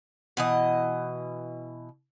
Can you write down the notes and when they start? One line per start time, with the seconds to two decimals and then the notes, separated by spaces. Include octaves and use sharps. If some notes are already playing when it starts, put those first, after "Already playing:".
0.37 B2 E3 D#5